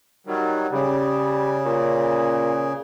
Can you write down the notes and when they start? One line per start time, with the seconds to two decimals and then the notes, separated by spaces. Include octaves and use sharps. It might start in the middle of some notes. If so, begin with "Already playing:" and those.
0.27 D#3 F#3 G3
0.72 C#3 G3
1.65 A#2